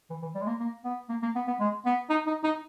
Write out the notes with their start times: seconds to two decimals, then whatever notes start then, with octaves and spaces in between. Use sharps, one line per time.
0.10 E3
0.22 E3
0.35 G3
0.41 G#3
0.47 A#3
0.60 A#3
0.85 B3
1.09 A#3
1.23 A#3
1.36 B3
1.47 B3
1.60 G#3
1.86 B3
2.10 D#4
2.27 D#4
2.44 D#4